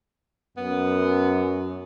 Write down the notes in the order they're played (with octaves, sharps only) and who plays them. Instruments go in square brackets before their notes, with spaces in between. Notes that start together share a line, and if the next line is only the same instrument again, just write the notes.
[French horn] F#2 [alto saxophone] B3